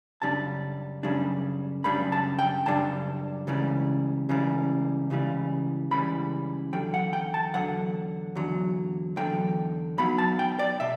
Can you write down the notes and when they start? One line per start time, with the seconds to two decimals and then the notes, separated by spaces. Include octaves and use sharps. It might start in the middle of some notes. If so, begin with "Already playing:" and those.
0.22 F#2 C#3 G3 D4 A5
1.03 F#2 C#3 G3 D4
1.84 F#2 C#3 G3 D4 B5
2.12 A5
2.39 G5
2.66 F#2 C#3 G3 D4 A5
3.47 C#2 C#3 E3 G3
4.29 C#2 C#3 E3 G3
5.10 C#2 C#3 E3 G3
5.91 C#2 C#3 E3 G3 B5
6.73 E2 D3 F#3 G5
6.94 F#5
7.13 G5
7.34 A5
7.54 E2 D3 F#3 F#5
8.35 E2 D3 F#3
9.16 E2 D3 F#3 G5
9.98 B1 B2 F#3 B5
10.18 A5
10.39 G5
10.59 D5
10.80 B2 E5